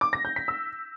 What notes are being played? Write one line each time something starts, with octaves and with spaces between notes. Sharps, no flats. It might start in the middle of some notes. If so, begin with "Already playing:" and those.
D6
A#6
G6
B6
E6